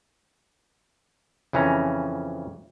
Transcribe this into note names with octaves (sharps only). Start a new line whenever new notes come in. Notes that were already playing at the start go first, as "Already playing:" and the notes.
F2 C#3 E3 C#4 A#5